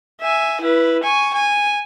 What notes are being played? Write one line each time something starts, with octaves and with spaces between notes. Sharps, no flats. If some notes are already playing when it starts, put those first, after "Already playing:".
E5 G#5
E4 B4
G#5 C#6
G#5